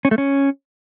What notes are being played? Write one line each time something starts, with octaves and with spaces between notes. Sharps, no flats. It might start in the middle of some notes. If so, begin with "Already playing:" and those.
C#4
A3
C#4